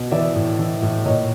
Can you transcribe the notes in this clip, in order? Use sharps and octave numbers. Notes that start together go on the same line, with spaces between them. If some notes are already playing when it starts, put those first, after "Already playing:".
Already playing: B2
E3 D5 E5
A2
E3
A2
A#2 C#5 D#5